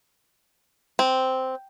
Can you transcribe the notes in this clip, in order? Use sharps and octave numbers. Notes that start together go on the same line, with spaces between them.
C4